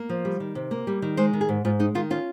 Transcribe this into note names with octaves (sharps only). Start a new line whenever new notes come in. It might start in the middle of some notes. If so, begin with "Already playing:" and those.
Already playing: A#3
F3
G3
D#3
C3
A#3
G3
D#3
G#3 C5
D#3
G#4
G#2
G#2 F4
G#3 D#4
D#3 F4
C#4 F4